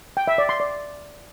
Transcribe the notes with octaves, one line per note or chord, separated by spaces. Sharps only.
G5
E5
D5
C6
D5